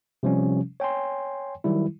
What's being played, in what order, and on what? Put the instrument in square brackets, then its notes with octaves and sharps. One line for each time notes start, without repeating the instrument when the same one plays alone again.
[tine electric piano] C3 F3 G3 C#4
C#5 G5 G#5 C6
D#3 F#3 G3 E4